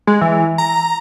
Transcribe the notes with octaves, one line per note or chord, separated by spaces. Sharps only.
G#3
E3
A#5